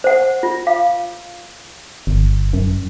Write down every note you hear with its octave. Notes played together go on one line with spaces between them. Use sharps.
C5 F#5
F4
F5
G1
F#2